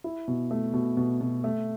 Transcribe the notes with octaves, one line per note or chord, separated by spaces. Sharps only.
E4
B2
A3
B2
B2
B2
A3